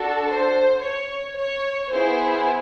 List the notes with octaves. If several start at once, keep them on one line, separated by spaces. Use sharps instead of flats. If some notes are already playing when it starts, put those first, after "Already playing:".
Already playing: D4 F#4 A4
C5
C#5
C#5
B3 E4 G#4 C5